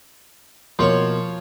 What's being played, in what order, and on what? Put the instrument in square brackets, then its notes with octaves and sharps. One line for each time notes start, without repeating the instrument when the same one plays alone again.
[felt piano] B2 A#3 C6 [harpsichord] F3 C#5 C#6